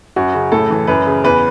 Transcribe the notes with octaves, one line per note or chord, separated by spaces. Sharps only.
F#2 F#4
C#3
A2 A4
E3
F#2 B4
C#3
E2 B4